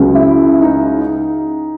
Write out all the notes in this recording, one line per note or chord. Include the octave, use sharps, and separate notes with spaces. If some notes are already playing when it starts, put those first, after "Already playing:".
Already playing: C#2 C#3 F#3
E4
D#4